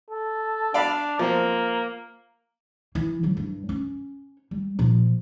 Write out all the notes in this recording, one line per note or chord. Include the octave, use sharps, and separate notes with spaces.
A4
D4 D5 F5 B5
F3 A#3 C4
E3
D3 F#3
G2
C#4
G3
A#2 F3